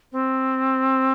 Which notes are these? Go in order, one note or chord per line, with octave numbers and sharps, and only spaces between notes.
C4